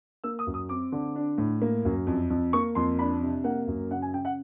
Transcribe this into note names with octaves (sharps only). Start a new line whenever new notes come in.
A#3 E6
D#6
F#2
D#6
C4 D6
D3
D4
A2
A#3
F#2
F2
F2
A#3 C#6
F2 C6
D4 B5
C3
A#3 F#5
F#2
C#3 F#5
G#5
C#3 G5
F#5